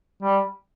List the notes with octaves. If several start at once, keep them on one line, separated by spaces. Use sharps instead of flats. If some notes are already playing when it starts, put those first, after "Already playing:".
G3